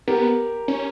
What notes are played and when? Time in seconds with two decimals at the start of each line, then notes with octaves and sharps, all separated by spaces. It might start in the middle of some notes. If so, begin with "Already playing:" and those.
0.07 B3 G4 A#4
0.68 C#4